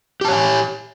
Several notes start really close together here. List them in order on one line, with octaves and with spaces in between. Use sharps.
G4 A5 C#5 G#5